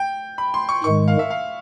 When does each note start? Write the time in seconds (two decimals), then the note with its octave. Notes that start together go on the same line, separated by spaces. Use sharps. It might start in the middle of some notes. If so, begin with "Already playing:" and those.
Already playing: G5
0.38 B5
0.54 C6
0.69 C#6
0.84 G#2 D#3 G#3 C#6
1.08 F5
1.19 E5
1.30 F5